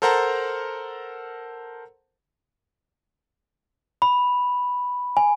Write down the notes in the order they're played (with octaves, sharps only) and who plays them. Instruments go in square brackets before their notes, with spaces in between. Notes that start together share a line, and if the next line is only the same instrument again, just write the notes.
[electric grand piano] A4 A#4 C5 F#5 A5 A#5
[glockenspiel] B5
G#5